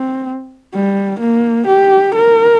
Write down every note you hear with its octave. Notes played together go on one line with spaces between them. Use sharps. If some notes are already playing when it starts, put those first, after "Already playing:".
Already playing: C4
G3
A#3
G4
A#4